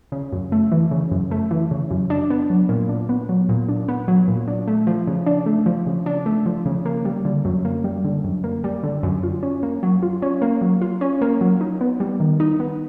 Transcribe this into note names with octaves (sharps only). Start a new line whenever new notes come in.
C#3
F#2
A3
E3
C#3
F#2
A3
E3
C#3
F#2
D4
B3
F#3
A#2
D4
B3
F#3
A#2
D4
B3
F#3
A#2
D4
A3
F3
C#3
D4
A3
F3
C#3
D4
A3
F3
C#3
A#3
G3
D3
F#2
A#3
G3
D3
F#2
A#3
G3
D3
F#2
F4
C#4
A#3
F#3
F4
C#4
A#3
F#3
F4
C#4
A#3
F#3
D#4
B3
G3
D#3
D#4
B3